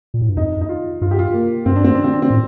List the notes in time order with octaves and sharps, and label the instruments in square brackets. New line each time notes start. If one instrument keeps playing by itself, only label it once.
[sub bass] A#2
A2
G2
[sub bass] F2 [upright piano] D#4
[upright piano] D#4
F4
[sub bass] G2 [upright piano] F4
[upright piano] G4
F4
A#3
[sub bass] G2 [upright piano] C4
[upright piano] D4
C4
D4
C4
D4
C4
[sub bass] A2